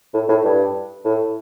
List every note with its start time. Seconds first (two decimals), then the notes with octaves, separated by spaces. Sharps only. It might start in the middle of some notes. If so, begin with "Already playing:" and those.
0.13 A2
0.29 A2
0.44 G2
1.05 A2